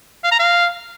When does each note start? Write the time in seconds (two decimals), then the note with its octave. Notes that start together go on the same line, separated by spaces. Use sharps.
0.24 F5
0.31 A#5
0.39 F5